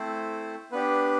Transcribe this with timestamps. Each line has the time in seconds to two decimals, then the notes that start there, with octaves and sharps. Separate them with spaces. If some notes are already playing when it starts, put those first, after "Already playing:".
Already playing: A3 C4 E4 A4 C5
0.72 B3 D4 G4 B4